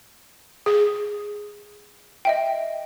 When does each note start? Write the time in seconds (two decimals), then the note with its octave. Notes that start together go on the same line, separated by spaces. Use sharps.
0.66 G#4
2.25 D#5 E5 G5